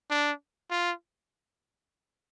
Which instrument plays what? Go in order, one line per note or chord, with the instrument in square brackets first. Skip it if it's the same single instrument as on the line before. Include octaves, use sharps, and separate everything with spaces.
[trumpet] D4
F4